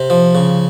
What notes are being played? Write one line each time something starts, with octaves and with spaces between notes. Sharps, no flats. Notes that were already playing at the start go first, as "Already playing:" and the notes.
Already playing: C3
F3
C#3